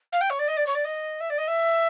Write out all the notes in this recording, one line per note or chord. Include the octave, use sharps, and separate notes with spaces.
F5
G5
C#5
D5
D#5
D5
C#5
D5
D#5
E5
D5
D#5
E5